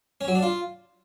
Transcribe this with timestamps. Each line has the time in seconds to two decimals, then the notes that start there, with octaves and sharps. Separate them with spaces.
0.21 C#4
0.28 F#3
0.35 D4
0.43 F4